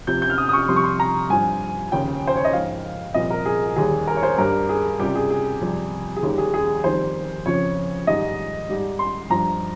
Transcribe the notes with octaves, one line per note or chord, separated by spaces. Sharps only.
F2 C3 F3 G6
G6
F6
D#6
D#6
C#6
F2 C3 G3 C6
C#6
C6
A#5
G2 F3 G#5
D#2 C#3 F3 G5
C5
C#5
D#5
G#2 F3 F5
C2 A#2 F3 D#5
A#4
G#4
D#2 D#3 G3 G#4
A#4
C#5
C5
G2 G3 A#4
G#4
C#2 C3 G3 G4
G#4
G#4
F2 C3 G3
G#4
D#2 D#3 G3 G4
G#4
G#4
F2 D#3 G3 C5
F2 C#3 F3 C#5
G#2 D#3 G3 D#5
G#2 G3
C6
G2 F3 A#5